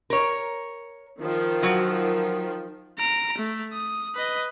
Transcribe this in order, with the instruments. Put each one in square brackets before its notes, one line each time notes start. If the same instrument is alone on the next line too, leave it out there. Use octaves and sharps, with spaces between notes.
[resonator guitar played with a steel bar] A#4 C#5
[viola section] D#3 F3
[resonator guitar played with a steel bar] F#3 F#4
[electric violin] A#5 D7
A3
D#6
B4 D#5